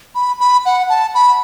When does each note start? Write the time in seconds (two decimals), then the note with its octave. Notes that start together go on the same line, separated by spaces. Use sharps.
0.15 B5
0.40 B5
0.65 F#5
0.89 A5
1.15 B5